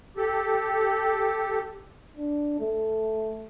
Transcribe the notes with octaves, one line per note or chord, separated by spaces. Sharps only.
G4 A4
D4
A3